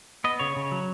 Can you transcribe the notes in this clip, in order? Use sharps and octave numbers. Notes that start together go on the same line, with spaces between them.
B3 D#5
C#3 C#5
C#3
F#3